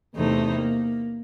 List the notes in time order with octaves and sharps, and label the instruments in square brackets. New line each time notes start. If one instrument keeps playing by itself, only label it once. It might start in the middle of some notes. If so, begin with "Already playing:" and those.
[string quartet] E2 C3 E3 A3 D#4 C5
A#3